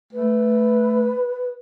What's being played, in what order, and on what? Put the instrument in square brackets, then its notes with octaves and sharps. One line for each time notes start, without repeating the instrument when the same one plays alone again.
[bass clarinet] A3 [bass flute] B4